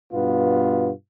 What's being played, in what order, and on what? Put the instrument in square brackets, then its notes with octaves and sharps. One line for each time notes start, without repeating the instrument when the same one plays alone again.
[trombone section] G2 B2 B3 F4